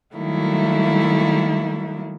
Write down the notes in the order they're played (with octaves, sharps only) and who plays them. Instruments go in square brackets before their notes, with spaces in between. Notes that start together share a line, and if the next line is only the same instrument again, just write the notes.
[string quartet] D#3 F#3 G3 A3 A#3 E4